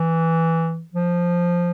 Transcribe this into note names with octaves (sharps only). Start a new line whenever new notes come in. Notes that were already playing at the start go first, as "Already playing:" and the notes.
Already playing: E3
F3